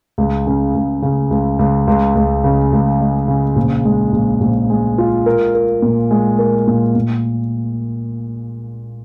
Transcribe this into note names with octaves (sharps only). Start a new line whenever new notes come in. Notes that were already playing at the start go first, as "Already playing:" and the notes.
C#2
C#3
C#2
C#3
C#2
C#2
C#2
C#2
C#3
C#2
G#3
C#3
A#1
G#3
A#1
A#1
G#3
F4
A#4
A#4
A#2
G#3
A#4
A#2
A#2